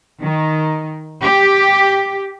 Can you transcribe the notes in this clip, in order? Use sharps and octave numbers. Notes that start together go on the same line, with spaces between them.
D#3
G4